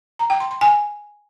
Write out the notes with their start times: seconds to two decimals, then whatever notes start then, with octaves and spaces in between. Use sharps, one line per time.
0.19 A#5
0.30 G5
0.40 C6
0.51 C6
0.61 G#5